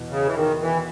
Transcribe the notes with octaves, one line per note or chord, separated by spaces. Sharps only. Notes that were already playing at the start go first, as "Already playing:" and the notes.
Already playing: E2 B2
C#3
E3
D#3
E3